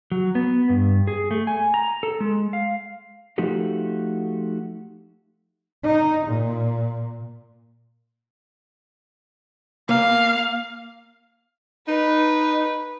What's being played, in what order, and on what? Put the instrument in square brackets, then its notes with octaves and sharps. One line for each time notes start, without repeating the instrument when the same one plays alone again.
[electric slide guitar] F#3
B3
G2
G#4
A3
G#5
A#5
A4
G#3
F5
F3 A3 D#4 F#4 G4 A4
[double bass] D#4
A#2
[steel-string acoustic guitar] A#3 [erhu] F5
[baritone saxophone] D#4 [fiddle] B4